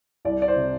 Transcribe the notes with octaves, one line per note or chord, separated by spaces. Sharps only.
C2 D5
D5
C5
C3